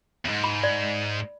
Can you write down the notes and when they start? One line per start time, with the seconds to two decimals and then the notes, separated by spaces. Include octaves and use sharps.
0.25 E2 G#2
0.44 B5
0.63 D5